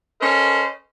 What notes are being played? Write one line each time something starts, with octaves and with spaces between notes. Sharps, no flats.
C#4 A4 A#4 C5 D#5